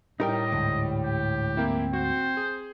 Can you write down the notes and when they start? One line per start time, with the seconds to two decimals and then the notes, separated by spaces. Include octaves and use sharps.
0.20 A2 G3 D#4 A#4 D#5 G5
0.52 D2 G#2
1.02 G4
1.57 A#3 C4 E4
1.93 F#4 C5
2.37 G#4